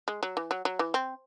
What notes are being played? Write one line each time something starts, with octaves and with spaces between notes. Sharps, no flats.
G#3
F#3
E3
F#3
F#3
E3
C4